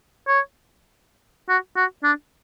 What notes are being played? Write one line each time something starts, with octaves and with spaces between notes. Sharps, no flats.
C#5
F#4
F#4
D4